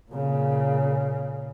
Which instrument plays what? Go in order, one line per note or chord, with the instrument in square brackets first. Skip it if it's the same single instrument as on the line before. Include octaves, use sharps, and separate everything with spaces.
[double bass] A#2 C#3